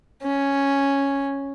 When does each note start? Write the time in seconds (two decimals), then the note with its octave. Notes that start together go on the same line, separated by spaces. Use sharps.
0.23 C#4